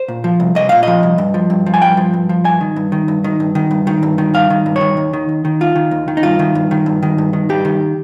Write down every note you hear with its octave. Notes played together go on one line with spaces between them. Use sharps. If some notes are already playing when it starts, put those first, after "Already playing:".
Already playing: C5
A#2
F3
C2
C2 D#5
A#2 F5
F3 D#5
C2
G2
F3
G2
F3
G#5
G2 G5
F3
G2
F3
G2 G#5
D#3
G2
D#3
G2
D#3
G2
D#3
G2
D#3
G2
D#3
G2 F5
D#3
G2
C#5
D#3
D#2
D#3
D#2
D#3
D#2 F4
D#3
D#2
D#3
D#4
G2 F4
D#3
G2
D#3
G2
D#3
G2
D#3
G2 G4
D#3